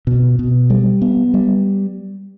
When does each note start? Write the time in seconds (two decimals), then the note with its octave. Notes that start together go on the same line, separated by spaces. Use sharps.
0.07 B2
0.39 B2
0.70 G3
1.02 B3
1.34 G3